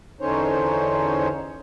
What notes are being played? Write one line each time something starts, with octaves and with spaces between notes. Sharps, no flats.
E2 D3 C#4 D#4 C5 C#5